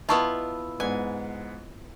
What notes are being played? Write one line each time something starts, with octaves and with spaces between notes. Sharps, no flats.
B3 E4 F4 D#5 A5 C#6
G#2 B3 D5 G#5